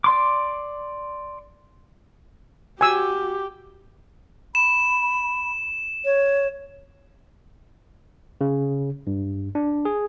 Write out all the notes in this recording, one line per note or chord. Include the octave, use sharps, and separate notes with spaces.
D5 C6 D6
F#4 G4 G#5 E6
B5 E7
C#5
C#3
G2
D4
G#4